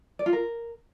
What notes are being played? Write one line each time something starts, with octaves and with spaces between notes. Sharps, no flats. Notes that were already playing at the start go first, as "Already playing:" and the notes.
D5
F4
A#4